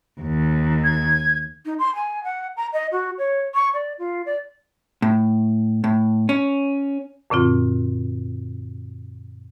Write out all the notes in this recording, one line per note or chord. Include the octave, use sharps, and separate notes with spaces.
D#2
G#6
D#4
C6
G#5
F#5
A#5
D#5
F#4
C#5
C#6
D5
F4
D5
A2
A2
C#4
F#2 A#2 D3 C4 F4